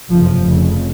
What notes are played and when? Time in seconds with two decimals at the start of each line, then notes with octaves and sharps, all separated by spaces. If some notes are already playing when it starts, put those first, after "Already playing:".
0.10 F#1 F2 C3 F3
0.41 F1 F2 C#3